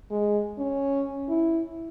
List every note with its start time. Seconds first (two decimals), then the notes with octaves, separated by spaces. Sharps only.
0.11 G#3
0.58 C#4
1.29 E4